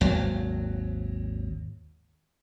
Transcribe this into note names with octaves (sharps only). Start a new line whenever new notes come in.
G#1 D#2 F#3